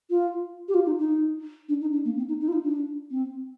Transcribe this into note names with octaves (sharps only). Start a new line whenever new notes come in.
F4
G4
F4
D#4
D#4
D4
D#4
D4
A#3
C4
D#4
D#4
F4
D#4
D4
C4